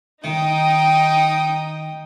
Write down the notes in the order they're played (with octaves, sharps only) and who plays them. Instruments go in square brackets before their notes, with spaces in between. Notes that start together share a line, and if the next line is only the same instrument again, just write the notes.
[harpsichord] D#3 [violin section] D#4 G5 D#6